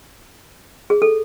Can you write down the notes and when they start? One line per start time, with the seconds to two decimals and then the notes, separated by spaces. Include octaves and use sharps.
0.90 G#4
1.02 A4